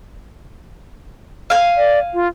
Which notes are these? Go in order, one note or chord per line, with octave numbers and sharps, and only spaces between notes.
F5 G#5
D5
F4